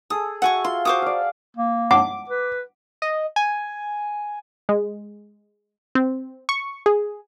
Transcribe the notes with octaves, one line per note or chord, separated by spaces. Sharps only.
G#4 A4 D#6
F#4 E5 F#5 G#5 C#6
F4 C6
F#4 C5 D6 D#6
D5 F5
A#3
F#5 D6
B4
D#5
G#5
G#3
C4
C#6
G#4